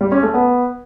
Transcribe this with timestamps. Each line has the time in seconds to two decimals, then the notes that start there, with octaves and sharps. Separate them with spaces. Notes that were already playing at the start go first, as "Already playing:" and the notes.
0.01 G3
0.12 C#4
0.23 A3
0.34 B3